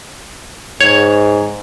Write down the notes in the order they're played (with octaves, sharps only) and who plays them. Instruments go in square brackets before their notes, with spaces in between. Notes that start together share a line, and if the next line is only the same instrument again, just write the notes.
[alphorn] G#2 [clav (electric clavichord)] C#5